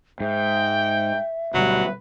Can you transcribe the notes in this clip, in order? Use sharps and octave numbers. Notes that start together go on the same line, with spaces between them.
G#2 E5 G5
D2 B2 F#3 G3 B4